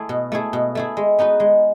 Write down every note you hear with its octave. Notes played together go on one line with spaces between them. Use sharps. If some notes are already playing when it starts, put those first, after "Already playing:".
Already playing: A3 E4 G#4
B2
A3 E4 G#4
B2
A3 E4 G#4
G#3
B3 D#4 F#4 B4
G#3